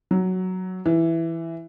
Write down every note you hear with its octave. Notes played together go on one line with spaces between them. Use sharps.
F#3
E3